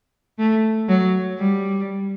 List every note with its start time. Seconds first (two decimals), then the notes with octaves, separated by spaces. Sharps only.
0.39 A3
0.88 F#3
1.38 G3